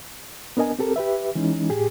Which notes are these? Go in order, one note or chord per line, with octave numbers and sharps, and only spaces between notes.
B3 D4 A#4 D#5 G#5
C4 G4 A4 A#4
G4 B4 E5
E3 G#3 C#4 D#4
A2 G4 G#4